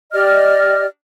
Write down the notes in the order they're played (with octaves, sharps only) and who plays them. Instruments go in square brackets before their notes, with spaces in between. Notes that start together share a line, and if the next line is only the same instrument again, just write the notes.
[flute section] G4 D5 D#5 F6